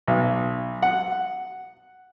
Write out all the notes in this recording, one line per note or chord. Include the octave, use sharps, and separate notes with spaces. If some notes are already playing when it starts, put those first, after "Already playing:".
B1
F#5